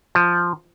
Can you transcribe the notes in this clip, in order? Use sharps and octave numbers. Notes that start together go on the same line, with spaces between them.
F3